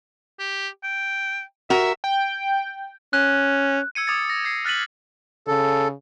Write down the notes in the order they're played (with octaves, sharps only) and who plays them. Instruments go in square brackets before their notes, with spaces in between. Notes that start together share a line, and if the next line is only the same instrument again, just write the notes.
[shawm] G4
G5
[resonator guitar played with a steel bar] F#4 A#4 [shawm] E5
[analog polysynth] G5
[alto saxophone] C#4 [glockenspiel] F#6
[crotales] E6 G#6 C#7 D#7
D6 D#6 G#6 A6 C#7
A#6
G#6 C7 C#7
F6 F#6 A6 B6 D#7 F#7
[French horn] C#3 [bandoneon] A4